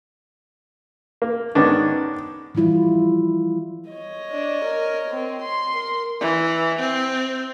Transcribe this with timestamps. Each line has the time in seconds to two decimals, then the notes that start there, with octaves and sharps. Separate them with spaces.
1.22 A#3
1.55 G#2 D#3 B3 C#4 D4
2.55 E3 F3 G3 E4 F4
3.90 C#5 D#5
4.31 D4
4.64 A#4
5.10 C4
5.42 C6
5.75 A#4
6.21 E3
6.79 C4